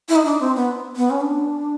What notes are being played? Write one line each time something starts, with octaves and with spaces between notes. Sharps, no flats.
E4
D#4
D4
C4
B3
B3
C#4
D4